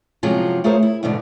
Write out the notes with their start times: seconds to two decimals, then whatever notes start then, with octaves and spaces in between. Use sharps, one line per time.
0.23 F#2 C3 F3 F#3 G#3 F4
0.64 A3 F4 G#4 A#4 C5 C#5
0.83 E4
1.03 E2 G#2 B2 D3